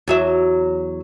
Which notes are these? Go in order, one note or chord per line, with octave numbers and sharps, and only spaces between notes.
E2 F#3 E5